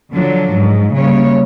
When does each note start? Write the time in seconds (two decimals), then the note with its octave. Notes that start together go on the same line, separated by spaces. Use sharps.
0.14 D3 F3 F#3 D4
0.54 G#2
0.94 C#3 G3 A#3 C#5